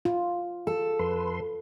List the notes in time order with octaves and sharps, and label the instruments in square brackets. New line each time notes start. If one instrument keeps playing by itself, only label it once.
[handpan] F4
[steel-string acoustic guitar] A4
[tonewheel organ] F2 B4 C6